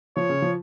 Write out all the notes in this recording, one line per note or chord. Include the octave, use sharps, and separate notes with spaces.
F3 C#5
C#3
F3